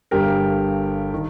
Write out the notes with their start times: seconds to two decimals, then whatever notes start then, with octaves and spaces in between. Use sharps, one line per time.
0.11 G1 G2 G3 G4 A#4
1.14 D#3